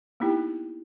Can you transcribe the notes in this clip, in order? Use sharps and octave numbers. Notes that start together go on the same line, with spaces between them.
A#3 B3 D#4 E4 G4 G5